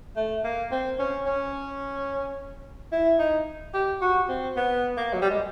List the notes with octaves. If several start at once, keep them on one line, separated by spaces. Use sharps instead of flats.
A3
A#3
C4
C#4
C#4
E4
D#4
G4
F#4
C4
B3
A#3
F#3
G3
G#3